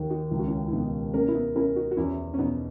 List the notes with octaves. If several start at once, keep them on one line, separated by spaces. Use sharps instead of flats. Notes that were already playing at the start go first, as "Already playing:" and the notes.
Already playing: D#2 D#3
D#4 F#4
C#2 E4
F#4
C#4 E4
E4
B2 B3 D#4
A#3 C#4 A#4
E4
B3 D#4
C#4 E4 A#4
D#4 F#4
F#4
E2 C#4 E4
C#4
B2 B3 D#4